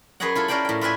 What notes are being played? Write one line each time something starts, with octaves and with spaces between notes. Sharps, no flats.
F#2 G#4 B4 C#5 D#5 F#5
E4 F4 A4
C#4 A#4 C5 D5 G5 B5
A2 G5
F4 B4 D5 E5 G#5